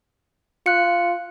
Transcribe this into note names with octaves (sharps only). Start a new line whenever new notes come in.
F4 F#6 C#7